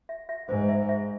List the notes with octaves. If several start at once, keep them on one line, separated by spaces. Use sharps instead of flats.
E5
E5
G#2 C5
E5
E5